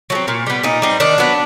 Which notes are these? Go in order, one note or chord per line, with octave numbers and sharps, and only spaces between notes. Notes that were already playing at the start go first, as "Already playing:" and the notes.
F#3 A3
C4
A#2
G3 B3
A#2 D#4
G3 C4
D#3 D4
F#3 B3